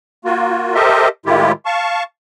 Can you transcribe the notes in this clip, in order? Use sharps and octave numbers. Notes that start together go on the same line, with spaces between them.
A#3 F4 F#4
G4 A4 A#4 C5 D#5 E5
A2 D#3 G#3 E4 F4 G4
F5 A5 C#6